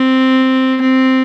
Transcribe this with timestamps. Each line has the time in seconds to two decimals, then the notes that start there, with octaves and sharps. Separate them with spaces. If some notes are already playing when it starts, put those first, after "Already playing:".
Already playing: C4
0.81 C4